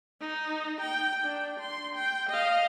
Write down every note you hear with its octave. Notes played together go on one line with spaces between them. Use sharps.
D#4
G5
D4
C6
G5
D#5 F5